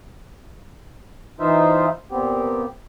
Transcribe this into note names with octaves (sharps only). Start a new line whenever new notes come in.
E3 D#4 F4 C5 E5
A#2 B3 C4 G4